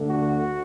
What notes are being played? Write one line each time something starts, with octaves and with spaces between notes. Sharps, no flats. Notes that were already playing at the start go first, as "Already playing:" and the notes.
Already playing: D2 D3 A3
F#4